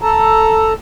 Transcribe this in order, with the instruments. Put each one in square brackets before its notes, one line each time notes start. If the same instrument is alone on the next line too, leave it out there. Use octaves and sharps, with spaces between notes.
[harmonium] A4 A5 A#5